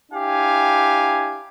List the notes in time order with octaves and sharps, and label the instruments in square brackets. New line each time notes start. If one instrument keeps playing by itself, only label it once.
[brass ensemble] D4 E4 G4 F5 G#5